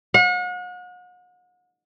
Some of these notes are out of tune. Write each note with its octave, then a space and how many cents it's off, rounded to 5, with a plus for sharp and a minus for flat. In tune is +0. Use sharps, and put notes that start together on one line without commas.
F#5 -40